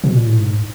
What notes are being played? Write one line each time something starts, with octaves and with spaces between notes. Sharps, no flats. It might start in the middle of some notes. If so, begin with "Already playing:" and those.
B2
A#2
A2
G#2